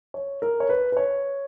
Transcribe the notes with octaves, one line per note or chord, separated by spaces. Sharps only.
C#5
A#4
C#5
B4
B4
C#5